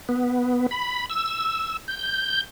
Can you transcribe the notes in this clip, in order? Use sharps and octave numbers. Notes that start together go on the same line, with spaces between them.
B3
B5
E6
G6